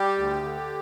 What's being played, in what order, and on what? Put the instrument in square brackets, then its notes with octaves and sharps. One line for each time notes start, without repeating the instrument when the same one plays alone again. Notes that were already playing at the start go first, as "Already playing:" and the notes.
Already playing: [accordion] G3 G4
D2
D3